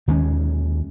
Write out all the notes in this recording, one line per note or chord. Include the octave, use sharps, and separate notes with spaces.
D#2 D#3 G#3 C#4